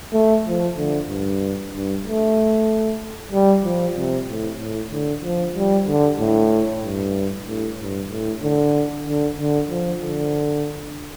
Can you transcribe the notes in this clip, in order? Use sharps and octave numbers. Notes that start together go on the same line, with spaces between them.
A3
F3
D3
G2
G2
A3
G3
F3
C3
A2
A2
D3
F3
G3
D3
A2
G2
A2
G2
A2
D3
D3
D3
F3
D3